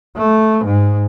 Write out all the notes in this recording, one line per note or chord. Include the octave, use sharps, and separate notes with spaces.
A3
G#2